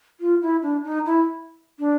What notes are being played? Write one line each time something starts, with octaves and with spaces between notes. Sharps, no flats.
F4
E4
D4
D#4
E4
D4